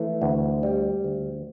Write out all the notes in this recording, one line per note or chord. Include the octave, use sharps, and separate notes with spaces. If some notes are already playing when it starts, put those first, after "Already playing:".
Already playing: E3 A3
D2
G3
D2